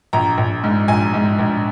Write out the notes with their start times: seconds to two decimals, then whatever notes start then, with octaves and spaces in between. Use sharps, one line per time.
0.13 A#1 A#5
0.38 A#1
0.64 G#2
0.88 A#1 G#5
1.13 G#2
1.39 A#1